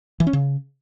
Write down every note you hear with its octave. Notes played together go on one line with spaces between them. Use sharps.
E3
C#4
C#3